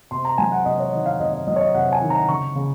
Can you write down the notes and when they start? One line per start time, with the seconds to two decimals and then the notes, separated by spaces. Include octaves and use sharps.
0.11 C3 C6
0.25 A#5
0.38 F#3 G#5
0.52 F#5
0.65 C3 D#5
0.79 C#5
0.92 D#3 D#5
1.06 F5
1.20 C3 D#5
1.33 D#5
1.47 F#3 D#5
1.56 C#5
1.61 D#5
1.74 C3 F#5
1.92 G#5
2.02 D#3
2.10 A#5
2.28 C#3 C#6
2.55 C#3